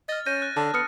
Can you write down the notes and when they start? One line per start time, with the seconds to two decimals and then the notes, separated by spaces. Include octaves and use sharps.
0.09 D#5 F6 A6
0.26 C#4 G6 A#6 D#7
0.42 F#6
0.57 D3 A5
0.74 B3 D#6 F6 C#7